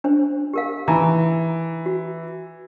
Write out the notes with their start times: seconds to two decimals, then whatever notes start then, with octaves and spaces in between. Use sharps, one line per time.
0.04 D4 C5
0.54 G4 A#4 F5
0.88 E3 D#4 A#5
1.86 F#4